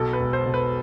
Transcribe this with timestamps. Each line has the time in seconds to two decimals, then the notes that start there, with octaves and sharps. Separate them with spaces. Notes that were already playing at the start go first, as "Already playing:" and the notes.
Already playing: B1 B2 A4
0.13 B4
0.20 E1
0.33 C5
0.46 B2
0.54 B4